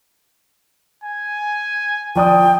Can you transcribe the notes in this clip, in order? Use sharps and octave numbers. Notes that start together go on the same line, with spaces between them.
G#5
F3 D5 G5 D#6